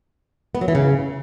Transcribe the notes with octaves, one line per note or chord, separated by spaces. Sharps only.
B3
F#3
E3
C#3